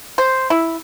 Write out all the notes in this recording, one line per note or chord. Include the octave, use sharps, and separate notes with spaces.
C5
E4